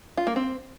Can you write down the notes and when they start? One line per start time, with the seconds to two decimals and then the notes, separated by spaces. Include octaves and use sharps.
0.17 F4
0.27 A#3
0.36 C4